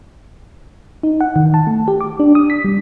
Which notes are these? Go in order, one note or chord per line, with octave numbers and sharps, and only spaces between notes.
D#4
F#5
D#3
A5
A3
G4
D6
D4
D#6
B6
G3